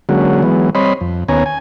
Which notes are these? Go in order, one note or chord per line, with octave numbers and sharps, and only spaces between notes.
D3 F#3 G#3 A#3 C#4 F#4
E3 F#3 G#3 B3
G3 C4 C#5 D#5 B5 C6
F2
D#2 B3 C#4 C#5 G#5 A#5
G#5